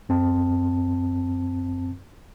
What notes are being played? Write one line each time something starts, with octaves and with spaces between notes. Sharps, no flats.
F#2 C4 A5